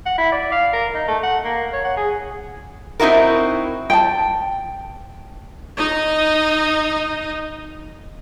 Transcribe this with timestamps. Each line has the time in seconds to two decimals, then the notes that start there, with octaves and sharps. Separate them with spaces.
0.06 F#5
0.18 E4
0.32 D5
0.52 F5
0.73 A#4
0.95 D#4
1.08 A3
1.24 F#5
1.45 A#3
1.73 C#5
1.85 F#5
1.97 G#4
3.00 C4 D#4 E4 F#4 A#4
3.90 G5 A5
5.77 D#4 D#5